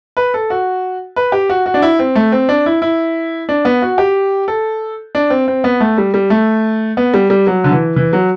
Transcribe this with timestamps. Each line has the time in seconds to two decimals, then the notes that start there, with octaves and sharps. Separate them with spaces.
0.17 B4
0.34 A4
0.50 F#4
1.16 B4
1.32 G4
1.49 F#4
1.66 F#4
1.74 D4
1.82 E4
1.99 C4
2.15 A3
2.32 C4
2.49 D4
2.66 E4
2.82 E4
3.49 D4
3.65 B3
3.82 F#4
3.98 G4
4.48 A4
5.15 D4
5.30 C4
5.48 C4
5.64 B3
5.80 A3
5.98 G3
6.14 G3
6.30 A3
6.97 B3
7.14 G3
7.30 G3
7.47 F#3
7.64 D3
7.72 E3
7.96 E3
8.13 F#3